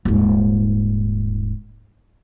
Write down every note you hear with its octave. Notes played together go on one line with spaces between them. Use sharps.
D#1 G#2